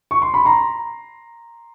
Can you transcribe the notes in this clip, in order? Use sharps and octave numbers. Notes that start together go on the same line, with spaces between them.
C#6
C6
B5
A#5 C6